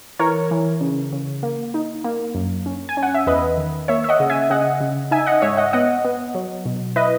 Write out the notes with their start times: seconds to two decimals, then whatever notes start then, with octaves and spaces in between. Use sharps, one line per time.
0.19 E3 A#4 C#5
0.51 E3
0.81 C#3
1.13 C#3
1.43 A#3
1.74 D#4
2.04 A#3
2.35 F#2
2.66 C#4
2.89 G#5
2.97 C#4
3.03 F#5
3.14 E5
3.27 E2 B4 D#5
3.57 D#3
3.88 A#3 C#5 E5
4.04 E5
4.09 D#5 F#5
4.20 C#3
4.30 E5 G#5
4.50 C#3 D#5 F#5
4.80 C#3
5.11 D#4 E5 G#5
5.27 D#5 F#5
5.42 G#2 C#5 E5
5.57 D#5 F#5
5.73 B3 D#5 F#5
6.05 B3
6.35 F#3
6.65 B2
6.96 E4 B4 D#5